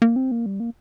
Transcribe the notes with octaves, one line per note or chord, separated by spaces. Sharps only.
A#3
C4
A#3
G3
A#3